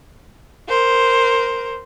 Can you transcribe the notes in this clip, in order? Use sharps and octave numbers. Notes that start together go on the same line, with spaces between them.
A#4 C5